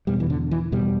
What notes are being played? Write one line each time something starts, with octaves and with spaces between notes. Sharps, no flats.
E2 B2 G3
E3
D3
E3
E2 B2 G3